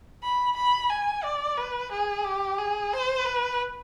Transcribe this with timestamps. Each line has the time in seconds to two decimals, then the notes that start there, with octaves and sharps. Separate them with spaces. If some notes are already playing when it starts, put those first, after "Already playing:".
0.23 B5
0.57 B5
0.90 G#5
1.24 D5
1.57 B4
1.92 G#4
2.24 G4
2.58 G#4
2.93 C5
3.25 B4